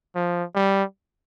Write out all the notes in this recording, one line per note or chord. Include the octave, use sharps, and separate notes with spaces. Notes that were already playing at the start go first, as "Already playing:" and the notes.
F3
G3